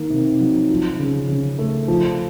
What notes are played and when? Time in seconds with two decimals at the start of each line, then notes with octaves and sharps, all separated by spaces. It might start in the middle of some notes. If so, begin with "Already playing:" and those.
Already playing: D#3 A#3
0.10 C3
0.40 F#3
0.70 F3
1.00 C#3
1.29 C#3
1.59 A3
1.88 F3